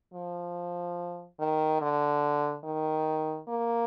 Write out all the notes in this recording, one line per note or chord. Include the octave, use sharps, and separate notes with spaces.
F3
D#3
D3
D#3
A#3